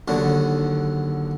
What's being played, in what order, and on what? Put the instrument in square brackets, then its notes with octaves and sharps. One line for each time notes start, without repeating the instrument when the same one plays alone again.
[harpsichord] D#2 D3 F#3